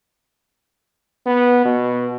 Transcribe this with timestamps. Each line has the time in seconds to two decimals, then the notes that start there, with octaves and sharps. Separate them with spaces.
1.26 B3
1.65 B2